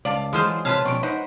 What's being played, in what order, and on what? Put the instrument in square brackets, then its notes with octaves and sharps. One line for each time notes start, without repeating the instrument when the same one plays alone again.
[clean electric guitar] C#2 [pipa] D5 F5 A5
[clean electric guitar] E3 F#3 G#4 [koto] G#3 F4 C5
[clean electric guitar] C3 [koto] F4 B4 F5 [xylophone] C#5 A5
[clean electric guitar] B2 F3 C#4 [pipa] G3 [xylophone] C#6 D7
[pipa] D#4 F#5 [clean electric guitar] B4 C5